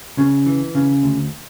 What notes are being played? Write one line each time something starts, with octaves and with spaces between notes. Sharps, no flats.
C#3
E3
C#3
D2